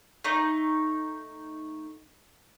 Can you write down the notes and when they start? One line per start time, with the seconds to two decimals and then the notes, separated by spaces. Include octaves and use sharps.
0.24 A3 D#4